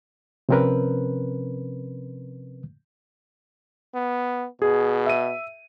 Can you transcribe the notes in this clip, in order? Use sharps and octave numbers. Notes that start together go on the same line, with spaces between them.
C3 F3 C4 C#4 A#4 B4
B3
B2 G#4
E5 D#7